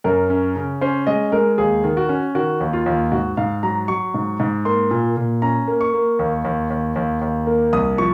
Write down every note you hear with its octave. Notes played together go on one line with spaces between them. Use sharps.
F#2 A#4
C#4
C#3
C#4 C5
G#3 D#5
G#3 A#4
D#2 G#4
D#3
F#4
C#4
D#3 F#4
D#2
F4
D#2
G#2 F#4
G#2 F5
F#3 A#5
F#3 C#6
G#2
G#2
A#3 C6
A#2
A#2
C#4 A#5
A#3
C#6
A#3
D#2
D#2
D#2
D#2
D#2
A#3
C2 D#6
F3 C#6